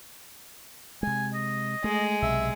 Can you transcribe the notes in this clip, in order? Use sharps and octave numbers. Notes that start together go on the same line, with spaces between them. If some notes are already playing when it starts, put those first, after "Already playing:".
C3 G#3 G#5
D#5
G#3 A3
B1 C3 E5